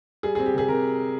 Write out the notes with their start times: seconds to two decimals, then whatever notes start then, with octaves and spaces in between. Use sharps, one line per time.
0.23 G3 G#4
0.35 G#4
0.39 C4
0.46 G4
0.54 C3 G#4
0.68 C3 A#4